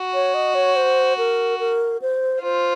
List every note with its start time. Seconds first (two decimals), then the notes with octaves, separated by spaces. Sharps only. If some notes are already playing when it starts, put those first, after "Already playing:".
Already playing: F#4
0.14 C#5
0.34 D#5
0.55 C#5
0.76 C5
1.18 A#4
1.60 A#4
2.02 C5
2.43 F4 C5